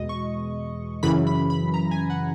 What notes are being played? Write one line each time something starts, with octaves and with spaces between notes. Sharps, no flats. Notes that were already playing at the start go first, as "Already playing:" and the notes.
Already playing: E2 B2 G#3 D#5
C#6
F#2 C#3 E3 B5
B5
B5
A#5
G#5
F#5